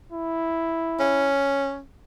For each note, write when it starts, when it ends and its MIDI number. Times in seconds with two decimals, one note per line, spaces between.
0.12 1.32 64
1.00 1.82 61